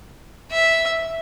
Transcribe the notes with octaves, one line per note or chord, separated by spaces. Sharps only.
E5